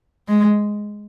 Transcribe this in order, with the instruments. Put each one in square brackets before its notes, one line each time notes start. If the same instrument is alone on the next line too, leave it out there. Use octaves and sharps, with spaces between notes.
[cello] G#3